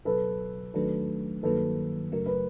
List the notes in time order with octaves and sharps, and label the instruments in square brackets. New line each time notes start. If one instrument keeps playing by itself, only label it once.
[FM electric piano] C#2 B2 F#3 [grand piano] A4 B4
[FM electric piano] D#2 D#3 F#3 A3 D4 [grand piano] A4 B4
[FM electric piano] G2 D#3 F#3 A#3 [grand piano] A4 B4
[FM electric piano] F#2 C#3 F#3 A3 [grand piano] A#4
[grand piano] B4